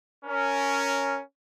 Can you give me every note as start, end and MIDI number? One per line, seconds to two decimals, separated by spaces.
0.25 1.19 61
0.25 1.19 70